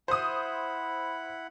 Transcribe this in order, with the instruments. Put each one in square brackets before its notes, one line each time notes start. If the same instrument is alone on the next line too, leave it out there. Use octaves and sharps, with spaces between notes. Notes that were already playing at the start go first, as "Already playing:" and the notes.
[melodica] E4 F#5 B5 [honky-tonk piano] C5 D#6